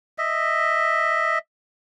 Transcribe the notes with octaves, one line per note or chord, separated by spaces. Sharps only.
D#5 E5